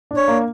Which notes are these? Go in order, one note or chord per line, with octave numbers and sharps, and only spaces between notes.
D4
C#5
A#3